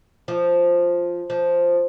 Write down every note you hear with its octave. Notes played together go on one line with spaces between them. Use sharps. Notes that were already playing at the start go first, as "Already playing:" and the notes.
F3
F3